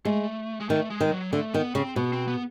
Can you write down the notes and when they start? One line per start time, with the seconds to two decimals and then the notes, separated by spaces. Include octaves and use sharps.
0.05 G#3 A3
0.61 G#3
0.69 D#3 A3
0.90 G#3
1.00 D#3
1.12 F#3
1.33 D3 A3
1.54 D#3 B3
1.75 C#3 C4
1.96 B2 B3
2.13 C4
2.28 B3